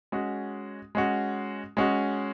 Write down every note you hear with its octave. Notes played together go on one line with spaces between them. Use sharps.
G#3 C#4 F#4
G#3 C#4 F#4
G#3 C#4 F#4